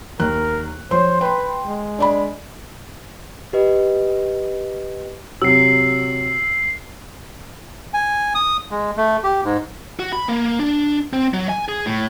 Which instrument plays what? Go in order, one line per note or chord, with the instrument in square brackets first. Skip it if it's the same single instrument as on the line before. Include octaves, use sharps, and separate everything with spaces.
[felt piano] D#2 F#6 [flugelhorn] A#4
[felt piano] F3 C#5 C6 [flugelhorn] C5
[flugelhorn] B4 [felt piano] G5 C6
[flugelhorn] G#3
[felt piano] D4 D5 B5
[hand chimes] G4 B4 D#5
[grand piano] C3 F#3 [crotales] E6 C7
[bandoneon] G#5
D#6
G#3
A3
G4
G#2
[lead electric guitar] F#4
B5
A#3
D4
C4
F#3
G#5
G#4
A2